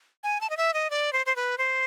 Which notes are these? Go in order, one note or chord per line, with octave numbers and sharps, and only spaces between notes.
G#5
A5
D#5
E5
D#5
D5
C5
C5
B4
C5